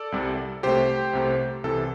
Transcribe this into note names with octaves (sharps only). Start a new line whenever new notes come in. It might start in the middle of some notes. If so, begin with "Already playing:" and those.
Already playing: A4 D5
C2 C3 G3
C2 C3 A3 G4 C5
C2 C3 A3
C2 C3 E3 A4